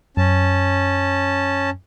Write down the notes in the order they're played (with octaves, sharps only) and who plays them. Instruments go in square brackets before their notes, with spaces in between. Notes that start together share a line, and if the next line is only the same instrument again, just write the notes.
[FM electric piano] F#2 [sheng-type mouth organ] C#4 A5